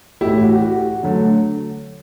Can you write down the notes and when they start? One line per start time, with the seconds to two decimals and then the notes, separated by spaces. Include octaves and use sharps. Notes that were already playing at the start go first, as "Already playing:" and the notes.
0.21 A2 E3 A3 E4 G4
0.42 F#4
0.54 G4
0.62 F#4
1.03 D3 F#3 A3